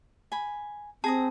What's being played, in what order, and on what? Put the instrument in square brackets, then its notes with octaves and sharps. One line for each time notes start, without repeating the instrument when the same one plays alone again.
[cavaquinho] G#5 B5
[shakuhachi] C4 [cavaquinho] G#4 A#5 D#6 [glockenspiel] A5